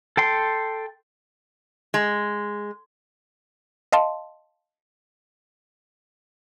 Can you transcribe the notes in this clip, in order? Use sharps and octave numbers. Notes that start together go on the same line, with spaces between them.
A4 G5 C6
G#3
D#5 F5 A5 C6